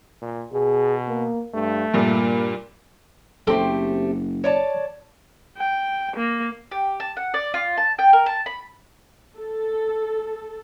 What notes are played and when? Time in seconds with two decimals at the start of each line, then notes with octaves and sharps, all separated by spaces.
0.22 A#2
0.53 B2 G#4
1.09 A#3
1.54 G2 A3
1.94 G2 A#2 A#3
3.47 F#1 A3 C4 G4 A4
4.44 C#5 D5 A5
5.57 G5
6.16 A#3
6.71 G4
7.00 A5
7.17 F#5
7.34 D5
7.54 F4
7.77 A5
7.99 G5
8.13 A#4
8.26 A5
8.46 B5
9.38 A4